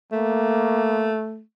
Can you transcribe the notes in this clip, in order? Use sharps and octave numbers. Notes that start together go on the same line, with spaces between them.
A3 A#3